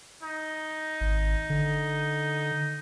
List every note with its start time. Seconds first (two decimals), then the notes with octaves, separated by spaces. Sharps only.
0.23 D#4
1.01 G#1
1.50 D3